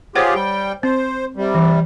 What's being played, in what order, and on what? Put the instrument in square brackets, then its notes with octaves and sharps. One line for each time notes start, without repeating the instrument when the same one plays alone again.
[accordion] F4 G4 G#4 [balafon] C5 C#5 F#5
[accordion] G3 G5
[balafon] C4 [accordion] C5
[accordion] C3 G3
[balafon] E3